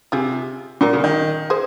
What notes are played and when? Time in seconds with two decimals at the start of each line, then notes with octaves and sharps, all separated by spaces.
0.12 C3 F4 G#4
0.81 A#2 F#4 A#4
0.93 C#3
1.04 D#3
1.50 G#4 C5